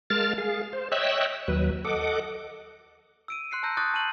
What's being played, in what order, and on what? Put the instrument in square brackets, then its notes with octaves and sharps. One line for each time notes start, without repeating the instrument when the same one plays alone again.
[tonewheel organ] G#3 A#4 F5 A5 F6 A6
G#4 F5
C5
C#5 D#5 E5 G5 E6 F#6
D#2 F#3 B4
A4 D#5 F#5 D6
[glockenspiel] E6 D7 D#7
C6 F#6 C7 C#7
A5 A#5 C6 E6 G6 A#6
C6 C#6 D#6 F#6 G6 A6
A5 D#6 D#7 F#7